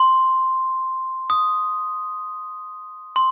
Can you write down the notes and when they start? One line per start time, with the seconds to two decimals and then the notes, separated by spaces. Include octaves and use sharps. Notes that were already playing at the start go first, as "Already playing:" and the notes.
Already playing: C6
1.30 D#6
3.16 C6